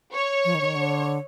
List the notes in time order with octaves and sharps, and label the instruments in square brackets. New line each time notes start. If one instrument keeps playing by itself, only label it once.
[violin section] C#5
[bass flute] F3
D#3
D3
D#3
D3